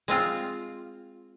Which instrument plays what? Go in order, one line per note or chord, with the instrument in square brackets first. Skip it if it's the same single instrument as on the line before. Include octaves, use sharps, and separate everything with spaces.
[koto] G#3 C4 F4